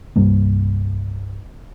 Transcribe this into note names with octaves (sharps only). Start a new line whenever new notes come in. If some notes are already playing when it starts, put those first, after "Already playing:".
C2 G2 G3 A#3